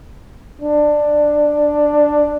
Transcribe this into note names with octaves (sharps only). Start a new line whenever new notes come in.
D4